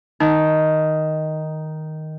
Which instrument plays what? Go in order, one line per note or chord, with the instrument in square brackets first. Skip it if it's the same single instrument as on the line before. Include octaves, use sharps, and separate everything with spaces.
[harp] D#3 [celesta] D#4